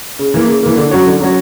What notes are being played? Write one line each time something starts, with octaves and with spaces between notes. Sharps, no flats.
C#3
E3 A#3
C#3
E3 A#3
D3
F#3 C#4 F#4 C#5
D3
F#3 C#4 F#4 C#5